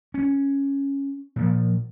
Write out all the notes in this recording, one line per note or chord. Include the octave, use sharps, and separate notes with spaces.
C#4
A#2 F3